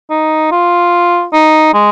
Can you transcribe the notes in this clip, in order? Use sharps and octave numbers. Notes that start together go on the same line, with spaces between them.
D#4
F4
D#4
G#3